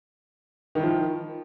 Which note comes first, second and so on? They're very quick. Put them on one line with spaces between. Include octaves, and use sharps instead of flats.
D#3 E4 F3